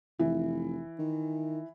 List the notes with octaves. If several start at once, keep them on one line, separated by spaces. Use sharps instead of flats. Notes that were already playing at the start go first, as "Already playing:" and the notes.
F1 E3
D#3